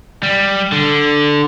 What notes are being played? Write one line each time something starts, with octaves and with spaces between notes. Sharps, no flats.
G3
D3